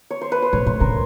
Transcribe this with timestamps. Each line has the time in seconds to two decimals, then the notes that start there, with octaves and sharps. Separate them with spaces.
0.11 C#5
0.21 C5
0.32 B4
0.42 C5
0.53 A2 C#5
0.66 A2 C5
0.80 D3 A#4